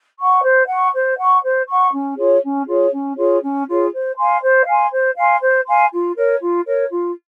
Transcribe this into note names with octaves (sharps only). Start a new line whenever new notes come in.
F#5 C#6
C5
F#5 C#6
C5
F#5 C#6
C5
F#5 C#6
C#4
F4 G#4 C#5
C#4
F4 G#4 C#5
C#4
F4 G#4 C#5
C#4
F4 G#4 C#5
C5
F5 G#5 C6
C5
F5 G#5 C6
C5
F5 G#5 C6
C5
F5 G#5 C6
F4
A#4 C#5
F4
A#4 C#5
F4